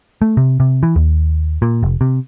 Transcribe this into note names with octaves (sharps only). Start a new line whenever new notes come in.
A3
C3
C3
E3
D#2
A#2
F1
C3